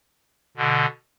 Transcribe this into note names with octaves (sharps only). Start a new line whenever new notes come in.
B2 D3